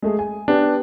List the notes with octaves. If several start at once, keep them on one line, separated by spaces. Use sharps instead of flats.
G#3 A3 G#4
G#5
B3 D4 G4 B4